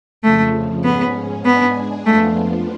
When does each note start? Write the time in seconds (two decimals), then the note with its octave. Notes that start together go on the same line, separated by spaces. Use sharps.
0.23 F2 C#3 F3 A3
0.84 G#2 G#3 B3 C#4
1.45 G#3 B3 D4 G#4
2.06 F2 F3 A3 B3 D4 F4